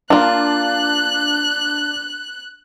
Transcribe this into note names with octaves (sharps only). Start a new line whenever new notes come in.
A#3 D4 F4 F#6